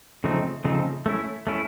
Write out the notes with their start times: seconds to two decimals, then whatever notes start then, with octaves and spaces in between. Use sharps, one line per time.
0.24 C#3 F3 A3 C4 D#4
0.64 C#3 F3 A3 C4 D#4
1.06 A3 C#4 E4
1.47 A3 C#4 E4